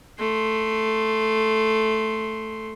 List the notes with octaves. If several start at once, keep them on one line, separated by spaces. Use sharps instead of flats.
A3 C6